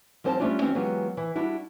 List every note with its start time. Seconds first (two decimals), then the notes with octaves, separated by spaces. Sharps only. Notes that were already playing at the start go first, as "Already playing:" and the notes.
0.24 F3 G3 C4 C5 C#5 A5
0.39 G3 A3 C#4 D4 F4 C#5
0.61 E3 C4 C#4 F#4
0.74 E3 F#3 G#3 B3 F4 G4
1.17 E3
1.35 G3 D4 E4 F#4